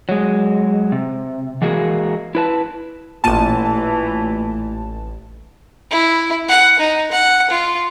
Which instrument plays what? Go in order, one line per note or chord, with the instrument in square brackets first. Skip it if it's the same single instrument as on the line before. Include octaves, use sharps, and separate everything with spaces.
[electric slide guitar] F#3 G#3
C3
E3 G#3 A#3 F#4 G#4 A#4
E4 B4 A5
[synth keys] A1 A5 [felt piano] A#2 D#7 [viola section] E3 A3
[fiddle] E4
F#5
D#4
F#5
F4